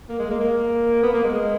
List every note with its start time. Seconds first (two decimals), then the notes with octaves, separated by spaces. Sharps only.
0.09 A#3
0.19 G#3
0.30 A#3
0.40 A#3
1.03 B3
1.14 A#3
1.24 G#3